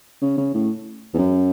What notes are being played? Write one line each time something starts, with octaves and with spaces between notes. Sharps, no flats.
C#3
C#3
A2
E2
F#2